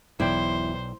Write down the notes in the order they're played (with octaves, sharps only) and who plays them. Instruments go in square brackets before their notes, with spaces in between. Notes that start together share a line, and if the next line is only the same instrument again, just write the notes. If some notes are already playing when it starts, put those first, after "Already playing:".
[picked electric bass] E1 B2 E3 [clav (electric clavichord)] B1 D5 G5 [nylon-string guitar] E4 [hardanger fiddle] C5